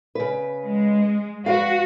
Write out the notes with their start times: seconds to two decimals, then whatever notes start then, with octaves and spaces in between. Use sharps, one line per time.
0.15 C#3 B4
0.64 G#3
1.46 F#4 B4 F5